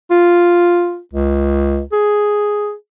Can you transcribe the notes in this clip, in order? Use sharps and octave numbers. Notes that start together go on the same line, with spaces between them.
F4
C#2
G#4